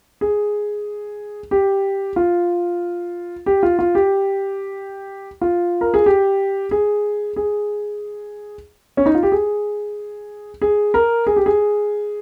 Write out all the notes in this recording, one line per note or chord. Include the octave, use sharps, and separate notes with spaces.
G#4
G4
F4
G4
F4
F4
G4
F4
A#4
G#4
G4
G#4
G#4
C#4
D#4
F4
G4
G#4
G#4
A#4
G#4
G4
G#4